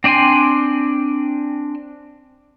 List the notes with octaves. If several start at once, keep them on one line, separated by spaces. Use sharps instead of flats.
C4 D4 G5 G#5 C6